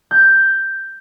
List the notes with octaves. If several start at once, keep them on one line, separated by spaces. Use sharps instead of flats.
G6